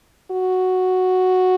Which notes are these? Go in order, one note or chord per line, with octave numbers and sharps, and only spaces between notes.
F#4